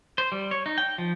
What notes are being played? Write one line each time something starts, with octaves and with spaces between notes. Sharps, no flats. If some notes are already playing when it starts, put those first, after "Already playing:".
C5
G3
C#5
D#4
G5
F3